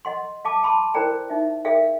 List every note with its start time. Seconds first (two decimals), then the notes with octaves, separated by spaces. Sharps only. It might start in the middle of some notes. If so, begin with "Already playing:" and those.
0.05 D#5 F#5 C6
0.45 F5 A5 D6
0.63 A5 B5 C6 D6
0.94 E4 A#4 C5 D5 G5 A#5
1.30 D#4 E5
1.65 G#4 A#4 D5 E5 F5 G5